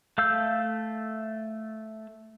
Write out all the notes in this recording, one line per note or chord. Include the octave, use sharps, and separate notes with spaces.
A3 F5 E6 G6